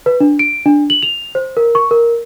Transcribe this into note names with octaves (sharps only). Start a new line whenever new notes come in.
B4
D4
D7
D4
F#7
F7
C5
A#4
C#6
A#4